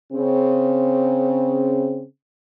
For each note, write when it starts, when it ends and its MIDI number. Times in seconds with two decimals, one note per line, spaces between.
0.13 2.04 49
0.13 2.04 60